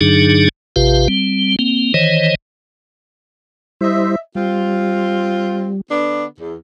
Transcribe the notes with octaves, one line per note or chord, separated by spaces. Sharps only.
G2 D3 F#3 D4 D#4 G#4
A1 C3 F4 G4 B4 F5
G3 C4
A#3 C4
D#3 E3 C5 C#5 D#5
G3 E4 C5 D#5 E5
G3 C4 F4
D3 B3 D4
E2